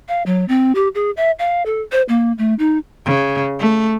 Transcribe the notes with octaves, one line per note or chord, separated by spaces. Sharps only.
F5
F#3
C4
G4
G#4
E5
F5
A4
C5
A#3
A3
D#4
C#3
A3